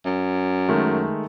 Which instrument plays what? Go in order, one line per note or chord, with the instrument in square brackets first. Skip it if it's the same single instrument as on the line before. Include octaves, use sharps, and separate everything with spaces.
[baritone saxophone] F#2
[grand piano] D#3 G#3 A3